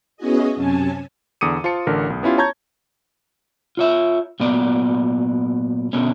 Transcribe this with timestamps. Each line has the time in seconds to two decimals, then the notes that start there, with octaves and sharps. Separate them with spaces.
0.17 B3 C#4 E4 F#4 G#4 D#5
0.56 F#2 C3 C#4 G#5 A5
1.41 E2 D3 D6 D#6 C#7 D#7
1.64 F4 C5 A5 C#7
1.87 A1 D3 A#4
2.10 B1
2.23 B3 C#4 E4 F4 G4
2.38 C#5 A5 A#5 C#6 G6 G#6
3.77 F4 C#5 E5
4.40 A#2 F#3 B3 D5
5.93 B2 D3 B3 C#4